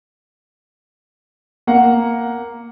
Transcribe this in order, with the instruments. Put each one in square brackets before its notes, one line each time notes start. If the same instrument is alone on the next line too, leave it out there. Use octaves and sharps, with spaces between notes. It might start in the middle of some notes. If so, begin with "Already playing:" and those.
[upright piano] A#3 F#5